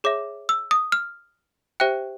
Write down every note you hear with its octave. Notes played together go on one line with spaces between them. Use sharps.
G#4 C#5 E5 D6
E6
D#6
F6
G4 C5 E5 G5 F#6